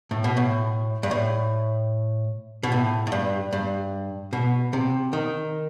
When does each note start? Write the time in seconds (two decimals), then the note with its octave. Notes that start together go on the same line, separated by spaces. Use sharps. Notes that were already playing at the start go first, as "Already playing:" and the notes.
0.11 A2
0.24 B2
0.37 A2
1.03 G2
1.11 A2
2.63 B2
2.72 A2
3.07 A2
3.12 G2
3.52 G2
4.33 B2
4.73 C3
5.13 D#3